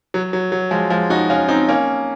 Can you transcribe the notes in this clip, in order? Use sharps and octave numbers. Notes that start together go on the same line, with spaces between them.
F#3
F#3
F#3
F3 G#3
F3 G#3
D#4 F#4
C#4 F4
C4 D#4
A#3 C#4